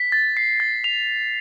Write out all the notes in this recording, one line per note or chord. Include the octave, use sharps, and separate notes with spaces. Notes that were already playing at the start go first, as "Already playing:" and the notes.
Already playing: B6
A6
C7
A6
F7